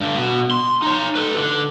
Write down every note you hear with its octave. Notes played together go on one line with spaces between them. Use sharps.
G2 D3
B2
C6
D#4 C#5
A4 B4
D3